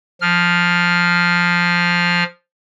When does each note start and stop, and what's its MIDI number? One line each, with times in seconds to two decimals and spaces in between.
0.21 2.24 53
0.21 2.24 89